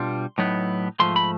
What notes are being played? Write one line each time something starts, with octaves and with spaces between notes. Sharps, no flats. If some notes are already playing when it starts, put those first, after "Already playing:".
Already playing: B2 G3 D4 F4 C6
A2 F#3 B3 D#4
G#2 F3 A3 C6
B5